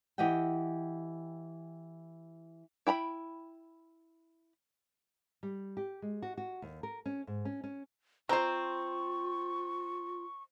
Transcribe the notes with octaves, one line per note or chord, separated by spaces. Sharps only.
E3 G4 D#5 F#5 G5
E4 G5 A#5 B5
G3
G4
G#3
F#4
F#4
D#2
A#4
C#4
G#2
C#4
C#4
C4 F4 C5 A#5 C#6